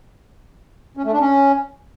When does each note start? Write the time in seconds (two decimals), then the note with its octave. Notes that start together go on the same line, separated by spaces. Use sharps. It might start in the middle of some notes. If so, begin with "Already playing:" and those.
0.97 C#4
1.05 A3
1.13 D4
1.20 C#4